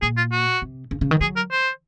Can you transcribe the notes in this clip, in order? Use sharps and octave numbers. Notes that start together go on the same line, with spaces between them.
A#2 G#4
F4
F#4
C3
C#3
C#3
D#3
F#3 G#4
A#4
C5